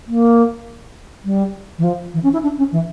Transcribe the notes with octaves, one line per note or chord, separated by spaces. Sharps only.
A#3
G3
E3
F3
E3
C#4
E4
D4
C#4
E3